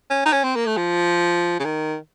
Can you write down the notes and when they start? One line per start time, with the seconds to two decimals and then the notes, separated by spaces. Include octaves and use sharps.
0.10 C#4
0.26 D#4
0.32 C#4
0.44 C4
0.55 A#3
0.66 A3
0.77 F3
1.59 C#3
1.65 D#3